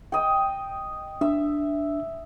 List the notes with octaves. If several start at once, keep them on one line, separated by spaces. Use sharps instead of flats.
D#5 G5
D4 E5